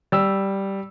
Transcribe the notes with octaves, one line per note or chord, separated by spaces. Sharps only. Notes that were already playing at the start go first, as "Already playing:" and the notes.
G3 E6